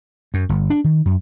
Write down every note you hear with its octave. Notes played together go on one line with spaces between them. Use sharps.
F#2
G1
D4
D#3
F#2